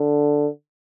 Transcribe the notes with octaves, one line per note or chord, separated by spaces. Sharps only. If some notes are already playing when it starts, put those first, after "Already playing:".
Already playing: D3